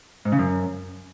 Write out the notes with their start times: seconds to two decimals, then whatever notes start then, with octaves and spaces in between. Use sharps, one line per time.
0.25 G#2
0.32 C#3
0.39 F#2